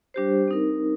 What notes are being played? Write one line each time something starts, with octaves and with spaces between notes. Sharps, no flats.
G3 D4 G4 C5
C4 D#4 A#4